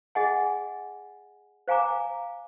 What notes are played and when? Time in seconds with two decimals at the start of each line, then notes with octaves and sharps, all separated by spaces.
0.15 G#4 D#5 F#5 G#5
1.68 C5 F5 G#5 A#5 D6